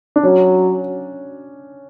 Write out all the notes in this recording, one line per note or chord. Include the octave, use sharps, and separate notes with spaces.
D4
F#3 C#4